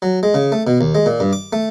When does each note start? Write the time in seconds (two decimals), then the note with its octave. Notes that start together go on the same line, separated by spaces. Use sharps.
0.02 F#3
0.23 G#3
0.34 C#3
0.52 A3
0.67 B2
0.81 D#2
0.95 G#3
1.06 A#2
1.20 G2
1.33 D6
1.53 A3